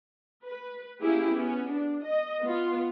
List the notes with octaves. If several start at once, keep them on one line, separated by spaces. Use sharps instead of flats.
B4
A#3 C#4 E4 G4 G#4
B3 C#4
D4
D#5
B3 F4